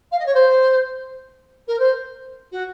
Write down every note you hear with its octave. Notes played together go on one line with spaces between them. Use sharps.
F5
D#5
C#5
C5
A#4
C5
F#4